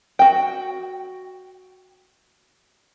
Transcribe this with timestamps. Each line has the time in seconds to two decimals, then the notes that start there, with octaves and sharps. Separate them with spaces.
0.19 F#4 G5